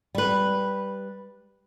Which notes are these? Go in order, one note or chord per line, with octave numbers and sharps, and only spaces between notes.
G3 B4